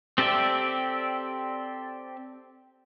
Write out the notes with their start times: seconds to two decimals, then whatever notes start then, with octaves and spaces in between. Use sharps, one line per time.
0.18 C4 G4 A4 D5 E5